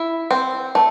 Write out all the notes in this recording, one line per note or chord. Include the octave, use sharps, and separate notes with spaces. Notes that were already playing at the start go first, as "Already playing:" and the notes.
Already playing: E4
C4
A3